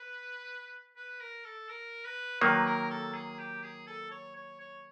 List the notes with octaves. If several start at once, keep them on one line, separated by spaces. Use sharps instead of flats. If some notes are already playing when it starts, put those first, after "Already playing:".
Already playing: B4
B4
A#4
A4
A#4
B4
D#3 F#3 A#3 B4
A#4
A4
G#4
G4
G#4
A4
C#5
C#5
C#5